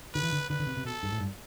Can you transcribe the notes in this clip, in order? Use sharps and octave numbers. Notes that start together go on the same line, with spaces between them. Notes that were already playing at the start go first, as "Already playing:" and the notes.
D3 B4
E3
D3
D3 B4
D3
C3
C3
B2 A4
G2
A2
G2